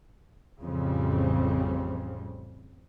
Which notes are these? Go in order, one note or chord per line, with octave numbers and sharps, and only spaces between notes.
A1 F2 C#3 G3 C4